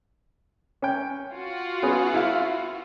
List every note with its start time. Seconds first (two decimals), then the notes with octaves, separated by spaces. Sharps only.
0.82 C#4 G5
1.32 F4 F#4
1.83 B3 C#4 G#4
2.14 E4 F5